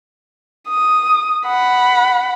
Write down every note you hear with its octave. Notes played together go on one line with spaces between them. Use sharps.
D#6
F#5 B5